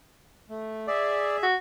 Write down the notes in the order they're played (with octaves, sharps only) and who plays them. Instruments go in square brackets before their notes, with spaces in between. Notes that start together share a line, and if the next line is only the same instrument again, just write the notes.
[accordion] A3
[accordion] G#4 E5 [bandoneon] D5
[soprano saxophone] F#4